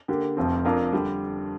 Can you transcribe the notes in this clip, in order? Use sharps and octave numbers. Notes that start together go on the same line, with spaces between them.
D3 A#3 G4
F1 F2 F3 C4
F2 F3 D4 A#4 F5
D3 G3